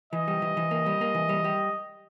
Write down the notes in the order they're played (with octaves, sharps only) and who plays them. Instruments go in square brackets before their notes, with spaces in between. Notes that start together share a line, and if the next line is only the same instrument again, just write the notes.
[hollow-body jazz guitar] E3 [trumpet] D#5
[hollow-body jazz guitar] G3
E3
E3
A#3
G3
A#3
E3
G3
G3